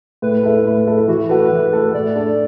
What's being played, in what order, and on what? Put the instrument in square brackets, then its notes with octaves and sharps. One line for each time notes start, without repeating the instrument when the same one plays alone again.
[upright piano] A2 [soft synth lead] B4
[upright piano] A3 E4 A4
A2
A3 E4 A4
[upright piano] E3 [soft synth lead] F#4
[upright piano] A3 F#4 A4 [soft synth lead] B4
[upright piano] E3
A3 F#4 A4
[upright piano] A2 [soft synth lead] D5
[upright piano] A3 D4 A4